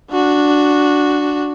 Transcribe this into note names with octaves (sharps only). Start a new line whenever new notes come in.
D4 F#4